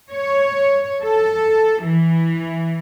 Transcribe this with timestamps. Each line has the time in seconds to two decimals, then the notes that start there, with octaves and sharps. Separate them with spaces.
0.11 C#5
1.03 A4
1.83 E3